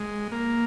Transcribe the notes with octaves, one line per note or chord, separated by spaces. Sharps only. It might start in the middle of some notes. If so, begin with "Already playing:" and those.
Already playing: G#3
A#3